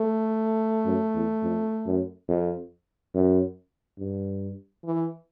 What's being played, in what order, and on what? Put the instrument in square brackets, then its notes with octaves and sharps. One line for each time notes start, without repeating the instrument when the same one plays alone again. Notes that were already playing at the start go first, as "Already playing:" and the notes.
Already playing: [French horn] A3
[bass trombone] F#2
E2
F2
F#2
F2
F#2
G2
[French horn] E3